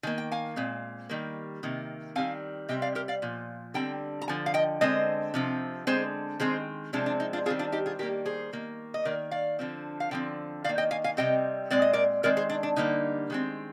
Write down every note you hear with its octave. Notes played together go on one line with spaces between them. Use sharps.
D#3 A#3 G#5
G5
F5 G#5
A#2 G#3 C4
D#3 G3 A#3
C3 D#3 A#3
D#3 G3 C4 F5 G#5
C3 G3 C4 D#5 G5
D5 F5
G4 A#4
D5 F5
A#2 F3
D3 G3 C4 G5 A#5
A#5
D3 F3 G#5
F5
D#5 G5
D3 G#3 C4 C5 D#5
C3 F3 C4
D3 G#3 C4 G#4 C5
D#3 G#3 C4 G#4 C5
C3 F3 G#3 C4 D4
D4
D#4
D4 F4
D#3 G3 C4 F4 G#4
D4 F4
D#4 G4
F4 G#4
D#3 G3 A#3 G4 A#4
G#4 C5
D#3 A#3
D#5
D#3 A#3 A#4 D5
D5 F5
D3 F3 C4
F5
D3 F3 C4 G5
D#3 A#3 D5 F5
D#5 G5
F5 G#5
F5 G#5
C3 G3 C4 D#5 G5
A#2 G#3 C4 D5
D#5
A#4 D5
D#3 G#3 C4 A#4 D5
G#4 C5
D4
D4
D3 G3 A#3 D#4
D#3 G#3 C4